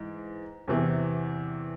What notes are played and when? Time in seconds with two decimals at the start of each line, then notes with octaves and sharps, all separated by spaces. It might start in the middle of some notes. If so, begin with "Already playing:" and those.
Already playing: G#2 E3
0.68 E2 C3 E3